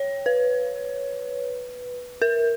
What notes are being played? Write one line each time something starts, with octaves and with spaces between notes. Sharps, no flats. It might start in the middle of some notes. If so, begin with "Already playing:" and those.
Already playing: C#5
B4
A#4